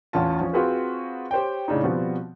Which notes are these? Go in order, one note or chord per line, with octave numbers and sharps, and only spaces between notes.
A1 E2 E3 C#4 F4 A5
F3 C#4
C4 F4 F#4 G#4 B4 C5
G4 C5 C#5 G5
A2 C#3 D4 D#4
B2 F3 G3 B3 C4 F#4